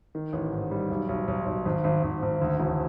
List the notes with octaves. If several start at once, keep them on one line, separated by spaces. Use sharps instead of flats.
D#3
A1
G#2
G3
B1
B1
B1
B1
G#1
G#1
G#1
G#1
D2
E1